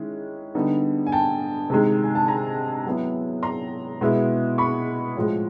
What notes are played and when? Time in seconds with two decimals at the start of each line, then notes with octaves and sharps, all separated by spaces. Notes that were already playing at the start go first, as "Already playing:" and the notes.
Already playing: D#3 G#3 C#4 E4
0.55 D3 G3 B3 D#4
1.07 G#5
1.12 G5 A5
1.70 C3 D#3 G#3
2.03 G#5
2.15 A5
2.28 G#5 A#5
2.86 F#3 B3 E4
3.43 A#5 C6
4.01 B2 G#3 B3 E4
4.58 B5 C#6
5.17 A2 F3 G#3